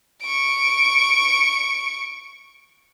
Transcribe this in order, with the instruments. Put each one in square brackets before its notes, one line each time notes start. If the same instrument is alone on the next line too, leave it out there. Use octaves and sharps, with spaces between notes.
[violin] C#6 D7